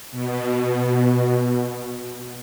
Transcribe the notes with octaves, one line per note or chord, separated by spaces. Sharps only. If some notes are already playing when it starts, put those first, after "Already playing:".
B2